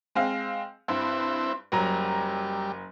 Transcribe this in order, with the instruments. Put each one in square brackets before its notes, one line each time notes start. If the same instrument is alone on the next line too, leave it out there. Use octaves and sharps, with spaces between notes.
[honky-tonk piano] G#3 C4 F5
[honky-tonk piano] G2 [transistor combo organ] C4 E4
[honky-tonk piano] F#1 F#3 A#5 [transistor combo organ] G3